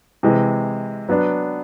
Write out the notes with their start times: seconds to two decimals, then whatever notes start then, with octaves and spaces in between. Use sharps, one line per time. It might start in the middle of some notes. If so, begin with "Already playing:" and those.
0.23 C3 E3 G#3
1.09 F#3 B3 D4